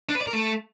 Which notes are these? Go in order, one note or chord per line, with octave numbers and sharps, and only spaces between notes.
D4
B4
D5
A#4
A3